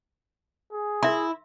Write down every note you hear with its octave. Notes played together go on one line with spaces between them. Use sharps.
G#4
E4 A#4 E5 C6